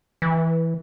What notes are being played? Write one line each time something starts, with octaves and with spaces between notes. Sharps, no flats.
E3